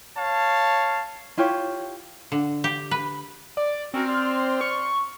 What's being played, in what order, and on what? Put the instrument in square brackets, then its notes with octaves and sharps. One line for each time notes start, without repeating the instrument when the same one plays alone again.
[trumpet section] C#5 F5 A5
[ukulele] E4 F4 G4 C#5
[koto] D3
G4
B4
[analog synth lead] D5
[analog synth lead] C4 [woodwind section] C#4 F#4 A#4
[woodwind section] D5 C6 F6
[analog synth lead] C#6